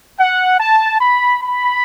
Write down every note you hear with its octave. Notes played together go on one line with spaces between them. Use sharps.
F#5
A5
B5
B5